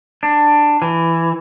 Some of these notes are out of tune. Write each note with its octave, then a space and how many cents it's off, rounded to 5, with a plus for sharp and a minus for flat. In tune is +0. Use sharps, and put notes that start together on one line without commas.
D4 +10
E3 +10